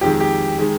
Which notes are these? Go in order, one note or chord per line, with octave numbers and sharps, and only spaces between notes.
F2 D#3 G#3 G4
G4
D#3 G#3